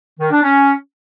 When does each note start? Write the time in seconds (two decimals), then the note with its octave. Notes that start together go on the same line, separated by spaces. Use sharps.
0.20 D#3
0.31 D4
0.43 C#4